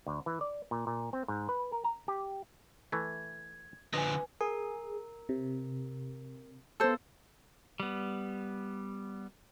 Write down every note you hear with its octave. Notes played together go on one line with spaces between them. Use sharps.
D2
E3
D5
A#2
A#2
C4
G#2
B4
A#4
A#5
G4
E3 A3 G#6
D3 F3 B4 D#5 G#5
G#4 A#4
C3
B3 A4 C5 E6
G3 B3